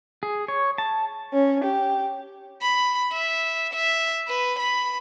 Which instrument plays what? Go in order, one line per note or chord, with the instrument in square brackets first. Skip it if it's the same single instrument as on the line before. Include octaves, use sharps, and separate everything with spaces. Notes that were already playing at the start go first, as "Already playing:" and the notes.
[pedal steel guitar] G#4
C#5
A5
[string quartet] C#4
G4
[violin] B5
E5
E5
B4
B5